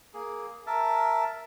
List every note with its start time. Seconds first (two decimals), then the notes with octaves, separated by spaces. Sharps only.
0.14 A#3 G#4
0.67 A#4 E5 A5